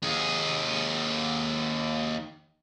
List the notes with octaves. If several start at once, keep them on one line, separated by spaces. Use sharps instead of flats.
D#2 G#4